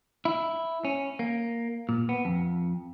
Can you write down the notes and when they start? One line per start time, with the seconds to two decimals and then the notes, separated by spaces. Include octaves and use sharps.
0.25 E4
0.85 C#4
1.19 A#3
1.89 A#2
2.09 B3
2.25 F2